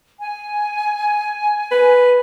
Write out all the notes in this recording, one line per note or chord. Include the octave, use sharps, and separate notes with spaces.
G#5
B4